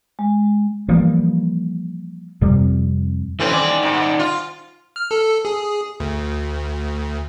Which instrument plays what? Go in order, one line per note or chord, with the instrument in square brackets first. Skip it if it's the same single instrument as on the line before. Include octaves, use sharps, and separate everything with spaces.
[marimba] G#3
[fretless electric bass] E3 F3 G3 A#3
F2 C3 G3
[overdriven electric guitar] A2 C#4 [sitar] E3 C4
[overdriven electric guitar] D#3 D5
[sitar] G#2
F4
[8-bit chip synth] F6
A4
G#4
D2